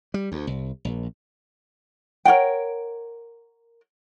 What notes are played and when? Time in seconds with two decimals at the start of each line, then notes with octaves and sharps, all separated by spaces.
0.14 G3
0.32 D2
0.47 C2
0.85 A#1
2.25 A#4 C#5 F#5 G5